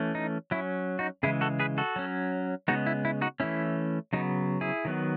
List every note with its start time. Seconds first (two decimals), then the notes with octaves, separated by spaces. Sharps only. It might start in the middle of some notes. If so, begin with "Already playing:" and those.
Already playing: E3 A3 C#4
0.15 D#4
0.51 F#3 C#4 E4
0.99 D#4 F#4
1.23 C#3 E3 G#3 E4 G#4
1.41 F#4 A4
1.60 G#4 B4
1.78 F#4 A4
1.96 F#3 C#4
2.68 C#3 G#3 B3 D#4 F#4
2.86 E4
3.05 E4
3.21 D#4 F#4
3.40 E3 A3 C#4 E4
4.13 C#3 F#3 B3 D#4
4.61 E4 G#4
4.85 D#3 F#3 B3